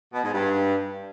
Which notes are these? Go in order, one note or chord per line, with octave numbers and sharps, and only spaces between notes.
B2
G#2
G2